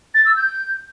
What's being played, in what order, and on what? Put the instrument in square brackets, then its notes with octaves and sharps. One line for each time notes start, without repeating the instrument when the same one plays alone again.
[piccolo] A6
E6
G6